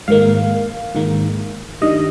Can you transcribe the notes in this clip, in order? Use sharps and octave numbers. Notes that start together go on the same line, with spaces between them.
G#2 D#3 A#3 F5
G#2 D#3 A#3
G2 D#3 G3 D#5